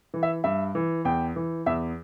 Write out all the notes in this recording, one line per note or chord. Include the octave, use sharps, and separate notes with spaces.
E3
E5
G2 E5
E3
E2 G5
E3
E2 E5